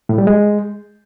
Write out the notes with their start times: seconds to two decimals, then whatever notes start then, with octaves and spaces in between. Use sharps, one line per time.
0.09 A2
0.18 G3
0.27 G#3